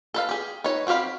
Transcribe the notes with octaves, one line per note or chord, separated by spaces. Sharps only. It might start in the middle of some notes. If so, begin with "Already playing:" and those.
A4 B4 F5
G4 G#4
D#4 B4 C#5
C4 F#4 G4 F5 B5